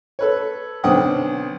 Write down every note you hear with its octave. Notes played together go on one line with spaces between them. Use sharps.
A4 B4 C#5
B1 D3 C4 F#5 G5 D#6